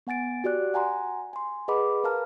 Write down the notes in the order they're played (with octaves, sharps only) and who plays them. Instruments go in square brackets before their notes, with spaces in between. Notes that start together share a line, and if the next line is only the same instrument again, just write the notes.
[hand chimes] B3 F#5 G#5 A6 D7
F#4 G4 D5 F#6
F#5 G#5 A#5 C6
G#5 C6
G#4 B4 D#5 F#5 B5 D6
A#4 B4 F5 A5 A#5 F6